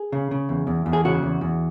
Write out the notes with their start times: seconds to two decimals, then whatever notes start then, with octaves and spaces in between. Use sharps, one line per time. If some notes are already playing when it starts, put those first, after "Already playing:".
Already playing: G#4
0.12 C#3
0.31 C#3
0.49 E2
0.67 E2
0.86 E2
0.93 G#4
1.05 C#3 F#4
1.23 E2
1.41 E2